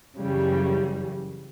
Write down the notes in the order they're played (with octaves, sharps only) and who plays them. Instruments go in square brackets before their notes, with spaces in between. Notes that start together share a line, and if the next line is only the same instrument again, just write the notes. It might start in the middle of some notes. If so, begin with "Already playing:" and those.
[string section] F#2 C#3 E3 G3